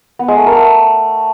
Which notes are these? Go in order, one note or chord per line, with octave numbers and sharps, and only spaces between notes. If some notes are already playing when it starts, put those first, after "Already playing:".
B3
G#3
A3
A#4
A3